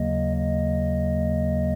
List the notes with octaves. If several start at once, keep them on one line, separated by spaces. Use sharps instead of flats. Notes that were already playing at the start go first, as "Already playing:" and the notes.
Already playing: D#2 C#3 F#3 A#3 D#5
D#5